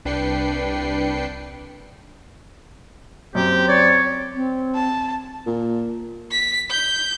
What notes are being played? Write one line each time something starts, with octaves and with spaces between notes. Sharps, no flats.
C2 D4 B4 G5 C7 C#7
F#2 C4 G4
C#5 D5
C4
A5
A#2
B6
G6